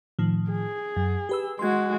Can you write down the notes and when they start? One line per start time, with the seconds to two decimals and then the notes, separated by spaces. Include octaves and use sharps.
0.19 A2 D#3 F3
0.51 G#4
0.96 F#2
1.29 G4 B4 E6
1.59 G#3 F#4 C6 G#6